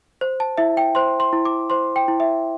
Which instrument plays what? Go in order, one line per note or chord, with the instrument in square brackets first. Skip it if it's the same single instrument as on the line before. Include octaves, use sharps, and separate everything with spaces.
[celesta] C5
A5
E4 E5
G5
C5 C6
C6
E4
D6
C5 C6
G5
E4
E5